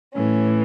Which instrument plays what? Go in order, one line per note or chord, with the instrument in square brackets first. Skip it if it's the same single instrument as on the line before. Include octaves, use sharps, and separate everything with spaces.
[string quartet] A2 E3 C#4